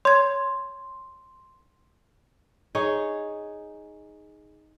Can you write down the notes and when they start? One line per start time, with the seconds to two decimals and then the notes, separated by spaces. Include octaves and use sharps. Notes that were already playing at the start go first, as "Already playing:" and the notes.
0.05 C#5 C6 G#6
2.75 D#4 G#4 C#5